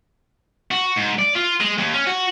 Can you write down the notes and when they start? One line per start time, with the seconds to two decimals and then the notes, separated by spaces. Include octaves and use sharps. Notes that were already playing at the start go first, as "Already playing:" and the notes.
0.71 F#4
0.96 G#2
1.19 D5
1.35 F4
1.61 G#3
1.78 D#2
1.94 C#4
2.07 F#4